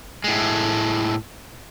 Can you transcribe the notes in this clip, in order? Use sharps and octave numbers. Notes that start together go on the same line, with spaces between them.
A2 G#3